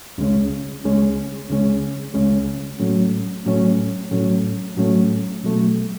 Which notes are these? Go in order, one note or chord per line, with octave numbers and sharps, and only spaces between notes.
C#2 C#3 G#3 C#4
C#2 C#3 G#3 C#4
C#2 C#3 G#3 C#4
C#2 C#3 G#3 C#4
A2 F#3 A3 C#4
A2 F#3 A3 C#4
A2 F#3 A3 C#4
A2 F#3 A3 C#4
B2 F#3 A3